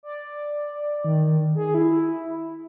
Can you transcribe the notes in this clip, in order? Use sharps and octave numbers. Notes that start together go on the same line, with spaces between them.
D5
D#3
G#4
E4